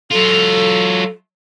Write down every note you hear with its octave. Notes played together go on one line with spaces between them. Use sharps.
F#3 F4 A4